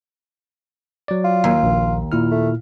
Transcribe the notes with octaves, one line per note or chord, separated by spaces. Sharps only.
F#3 D5
F4
D#2
A#1
A#2 E4 F6
A3